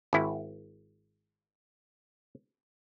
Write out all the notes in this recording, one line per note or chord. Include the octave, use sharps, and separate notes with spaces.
G#1 E4